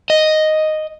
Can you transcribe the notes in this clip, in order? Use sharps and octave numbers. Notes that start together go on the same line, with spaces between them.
D#5